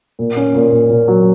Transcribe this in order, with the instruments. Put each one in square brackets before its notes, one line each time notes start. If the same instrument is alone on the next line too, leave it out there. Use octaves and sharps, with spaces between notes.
[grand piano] A#2
C#4
A#2
A#2
A#2
F#3